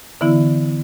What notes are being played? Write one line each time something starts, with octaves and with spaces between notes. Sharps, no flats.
D3 E3 B3 E4